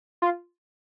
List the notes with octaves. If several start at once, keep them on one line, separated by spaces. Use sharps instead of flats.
F4